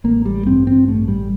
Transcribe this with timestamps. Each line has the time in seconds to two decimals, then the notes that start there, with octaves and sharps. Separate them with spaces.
0.04 A1 A#3
0.25 G3
0.46 G2 C4
0.67 C4
0.88 A1 A3
1.08 G3